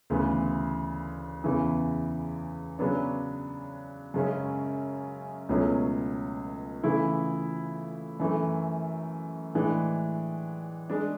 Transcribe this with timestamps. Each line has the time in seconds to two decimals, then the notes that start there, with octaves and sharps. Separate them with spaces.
0.10 D2 C#3 E3 B3
1.44 E2 C#3 E3
2.79 C#3 F#3 B3 D4
4.14 F#2 C#3 G#3 C#4
5.49 C#2 B2 F#3 A3 C#4
6.84 C#3 E3 A3 E4
8.20 F#2 E3 A3
9.54 A2 E3 G#3 D4
10.90 G#3 D4